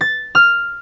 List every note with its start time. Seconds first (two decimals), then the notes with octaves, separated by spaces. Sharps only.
0.01 A6
0.35 F6